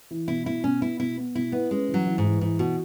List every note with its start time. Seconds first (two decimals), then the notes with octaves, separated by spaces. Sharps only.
0.11 E3
0.28 B2 E4
0.46 B2 E4
0.64 B2 C#4
0.82 B3 E4
0.99 B2 E4
1.17 B3
1.35 B2 E4
1.52 B3 E4
1.71 G#3 C#4
1.89 E3
1.94 F#3
2.06 E3
2.18 G#2
2.24 E3
2.41 G#2 E3
2.59 B2 F#4